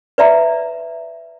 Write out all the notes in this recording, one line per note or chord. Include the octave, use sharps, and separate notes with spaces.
B4 D5 E5 A#5